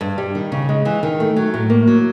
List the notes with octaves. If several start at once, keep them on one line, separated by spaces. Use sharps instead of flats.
G2
G3
D#3
C#3
G#3
E3
D#3
A3
F#3
A2
A#3
F#3